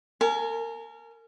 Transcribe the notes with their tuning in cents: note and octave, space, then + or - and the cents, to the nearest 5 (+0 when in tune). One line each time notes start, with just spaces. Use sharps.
A#4 -30 G#5 +25